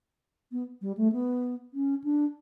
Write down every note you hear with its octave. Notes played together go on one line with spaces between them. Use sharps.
B3
G3
A3
B3
C#4
D4